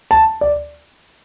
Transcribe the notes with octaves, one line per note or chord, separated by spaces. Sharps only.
A5
D5